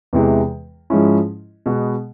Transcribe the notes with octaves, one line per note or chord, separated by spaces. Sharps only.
E2 C3 E3 G#3
G#2 F3 G#3 C#4 E4
B2 G#3 B3